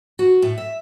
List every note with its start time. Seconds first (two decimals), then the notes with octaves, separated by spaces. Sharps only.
0.19 F#4
0.42 A2
0.58 E5